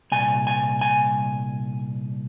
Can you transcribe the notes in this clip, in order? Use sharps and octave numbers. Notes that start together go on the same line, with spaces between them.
C2 A#2 G#5
G#5
G#5